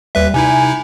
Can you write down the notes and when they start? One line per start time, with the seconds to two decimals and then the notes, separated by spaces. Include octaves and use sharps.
0.15 D#2 G3 B4 E5
0.34 C3 D#4 E4 G#5